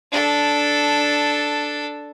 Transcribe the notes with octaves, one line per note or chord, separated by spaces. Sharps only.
D4 A4